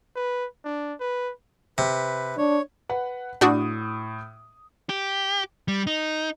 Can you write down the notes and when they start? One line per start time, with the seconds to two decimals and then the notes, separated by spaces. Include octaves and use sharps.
0.16 B4
0.65 D4
1.00 B4
1.78 C3 B4
2.38 D4 C#5
2.89 B4 F#5
3.41 A2 D4 F#4 D#6
4.89 G4
5.68 G3
5.87 D#4